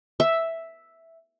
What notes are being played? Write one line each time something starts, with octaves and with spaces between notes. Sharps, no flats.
E5